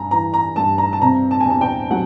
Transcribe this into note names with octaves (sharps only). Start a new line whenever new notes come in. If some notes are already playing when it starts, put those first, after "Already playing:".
Already playing: G2 G#5 A#5
E3 A#5
A#5
G2 A5
A#5
A5
C3 A#5
A5
G#5
E2 A5
G5
F#3 F#5